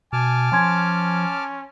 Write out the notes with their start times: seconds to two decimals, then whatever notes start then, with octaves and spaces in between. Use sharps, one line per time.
0.13 B2 G#5 A5 D6 F6
0.52 F3 C#4 G#5 C6 G#6